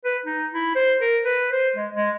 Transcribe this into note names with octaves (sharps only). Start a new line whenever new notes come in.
B4
D#4
E4
C5
A#4
B4
C5
G#3
G#3